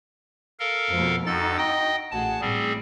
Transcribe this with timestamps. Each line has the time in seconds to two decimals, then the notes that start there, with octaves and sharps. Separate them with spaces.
0.59 A4 A#4 F5
0.89 F2 B2
1.26 F2 D#4 F#4 A4 A6
1.58 D#5 G5 D#6
2.11 A1 F#4 G#4 A5
2.41 A1 G3 C4 G#4